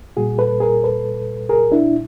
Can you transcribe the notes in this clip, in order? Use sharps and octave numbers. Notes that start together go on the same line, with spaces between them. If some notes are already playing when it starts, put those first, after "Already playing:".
A#2 G3 F#4 G#4
A4 B4
G#4 A#4
A4 B4
G#4 A#4
D4 E4